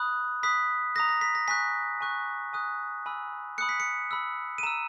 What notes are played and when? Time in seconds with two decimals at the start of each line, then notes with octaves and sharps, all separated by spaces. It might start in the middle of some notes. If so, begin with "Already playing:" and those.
Already playing: B5 D#6 F#6
0.43 B5 D#6 F#6 B6
0.95 A#5 D#6 F#6 A#6
1.09 A#6
1.21 B6
1.35 A#6
1.48 G#5 C#6 F#6 B6
2.01 G#5 C#6 F#6
2.53 G#5 D#6 F#6
3.06 G#5 B5 E6
3.58 B5 D#6 F#6 C#7
3.69 B6
3.80 C#7
4.11 B5 E6
4.58 D#7
4.63 A#5 E6 E7